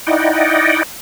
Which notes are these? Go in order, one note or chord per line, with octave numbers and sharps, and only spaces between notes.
D#4 E4 D5 D#5 F#5 G5